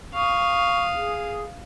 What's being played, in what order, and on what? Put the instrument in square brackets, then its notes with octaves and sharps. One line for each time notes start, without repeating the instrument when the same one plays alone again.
[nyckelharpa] F5 D#6 [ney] C#6
[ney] G#4